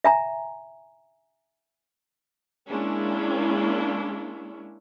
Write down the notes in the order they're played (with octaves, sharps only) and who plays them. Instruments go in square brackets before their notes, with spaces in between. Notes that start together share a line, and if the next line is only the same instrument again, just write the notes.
[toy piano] E5 G#5 A#5
[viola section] G#3 A#3 C#4 D4 E4